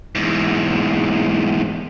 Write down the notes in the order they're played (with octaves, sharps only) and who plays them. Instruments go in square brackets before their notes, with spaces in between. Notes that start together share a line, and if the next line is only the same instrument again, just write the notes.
[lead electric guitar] E2 G#2